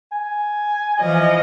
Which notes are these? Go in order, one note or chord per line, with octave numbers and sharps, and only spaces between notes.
G#5
E3 F3 D#5